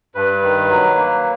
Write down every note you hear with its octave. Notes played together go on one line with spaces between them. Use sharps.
G2 B4
D#3
F#3
A#3